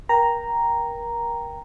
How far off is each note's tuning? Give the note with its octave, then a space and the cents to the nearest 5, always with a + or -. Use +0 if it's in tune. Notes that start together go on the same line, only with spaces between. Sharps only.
A#4 +25 G5 +0 A#5 +0